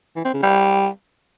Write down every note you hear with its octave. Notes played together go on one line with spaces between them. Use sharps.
E3
C4
C#3
G3